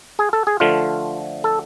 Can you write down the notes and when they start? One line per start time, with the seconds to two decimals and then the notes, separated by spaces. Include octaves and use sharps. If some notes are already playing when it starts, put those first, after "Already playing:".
0.19 G#4
0.33 A4
0.47 G#4
0.60 D3 F3 A3 F4
1.44 A4